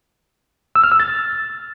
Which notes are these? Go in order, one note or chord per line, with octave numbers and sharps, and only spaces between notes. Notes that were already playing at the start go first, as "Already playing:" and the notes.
E6
F6
E6
A6